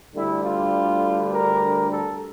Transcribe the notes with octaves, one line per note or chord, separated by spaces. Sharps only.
D2 D3 G3 E4
F4
A#4
A4